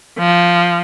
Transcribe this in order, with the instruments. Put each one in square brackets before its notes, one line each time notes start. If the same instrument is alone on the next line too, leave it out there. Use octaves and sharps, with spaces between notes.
[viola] F3